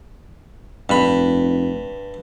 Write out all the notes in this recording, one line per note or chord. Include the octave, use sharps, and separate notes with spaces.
F1 G2 B5